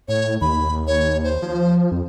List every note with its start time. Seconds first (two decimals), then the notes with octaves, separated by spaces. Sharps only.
0.08 A2 C#5
0.41 D#2 B5
0.87 C#5
1.24 C5
1.42 F3
1.92 F2